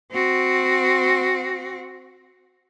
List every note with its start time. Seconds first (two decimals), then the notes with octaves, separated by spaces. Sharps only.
0.12 C4 F#4